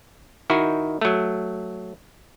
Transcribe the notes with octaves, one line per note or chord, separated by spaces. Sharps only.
D#3 D#4 E4 F#4
F#3 A3